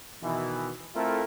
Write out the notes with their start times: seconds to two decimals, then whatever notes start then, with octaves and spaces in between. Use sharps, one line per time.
0.23 B2 D#3 E3
0.95 A3 C4 E4 F4 A4 A#4